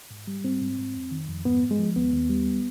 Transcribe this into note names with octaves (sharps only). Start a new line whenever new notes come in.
G#2
G3
G#2 C4
G#2
G#2
F2
D#3
F2
G#2 B3
G#2
G#3
F3
D#2 B3
D#2
G3